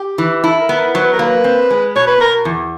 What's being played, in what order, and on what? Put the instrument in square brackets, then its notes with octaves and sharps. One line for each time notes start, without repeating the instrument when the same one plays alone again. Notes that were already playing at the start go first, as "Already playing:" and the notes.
Already playing: [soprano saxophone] G4
[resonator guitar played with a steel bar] E3
[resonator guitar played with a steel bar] E4 [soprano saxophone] A4
[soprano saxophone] A#4
[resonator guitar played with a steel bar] B3
[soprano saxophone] A#4
[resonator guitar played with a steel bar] F#3 [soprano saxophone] C5
[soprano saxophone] B4
A#4
[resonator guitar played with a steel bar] A#3 [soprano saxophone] B4
[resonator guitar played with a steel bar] C4
G#3
[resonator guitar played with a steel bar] B2 [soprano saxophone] C#5
[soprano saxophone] B4
[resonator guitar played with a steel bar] B2 [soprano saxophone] A#4
[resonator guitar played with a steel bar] E2